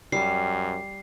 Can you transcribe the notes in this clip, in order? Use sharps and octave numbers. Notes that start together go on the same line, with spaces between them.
F#2 G3 C7